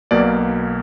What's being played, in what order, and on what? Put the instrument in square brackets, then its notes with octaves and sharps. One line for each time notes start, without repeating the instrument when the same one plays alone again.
[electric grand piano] B1 B2 A#3 D5